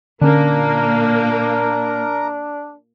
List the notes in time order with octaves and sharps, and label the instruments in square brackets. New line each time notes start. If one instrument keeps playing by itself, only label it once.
[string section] A#2 A#3 [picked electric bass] D3 C#4 [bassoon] D4 [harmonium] A#4